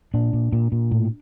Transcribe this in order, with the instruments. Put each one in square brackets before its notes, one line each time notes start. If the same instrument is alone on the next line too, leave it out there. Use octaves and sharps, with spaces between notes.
[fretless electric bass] A#2 D4
A#2
A#2
A#2
A2